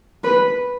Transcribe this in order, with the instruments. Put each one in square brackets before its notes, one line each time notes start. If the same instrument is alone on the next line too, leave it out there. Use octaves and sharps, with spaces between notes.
[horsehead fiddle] B4